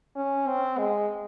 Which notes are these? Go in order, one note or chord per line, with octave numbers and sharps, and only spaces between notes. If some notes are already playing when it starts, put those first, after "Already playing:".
C#4
C4
G#3